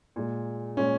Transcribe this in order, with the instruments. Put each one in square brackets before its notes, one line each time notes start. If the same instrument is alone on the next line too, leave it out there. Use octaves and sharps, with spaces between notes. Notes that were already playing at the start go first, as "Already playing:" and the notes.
[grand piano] A#2 G#3
A#2 G#3 C#4